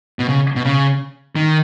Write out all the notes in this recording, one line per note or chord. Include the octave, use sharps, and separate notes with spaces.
B2
C#3
B2
C#3
D#3